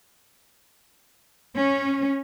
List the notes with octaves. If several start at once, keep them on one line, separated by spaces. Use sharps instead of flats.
C#4